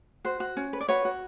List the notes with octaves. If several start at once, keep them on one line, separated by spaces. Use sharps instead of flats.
F#4 C5
F#4
C#4
B4
D5
F#4 B4 C#5
F#4